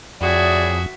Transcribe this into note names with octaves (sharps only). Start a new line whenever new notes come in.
F2 A2 G3 F#4 G#4 D5 E5